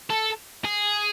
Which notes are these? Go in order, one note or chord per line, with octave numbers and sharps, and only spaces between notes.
A4
G#4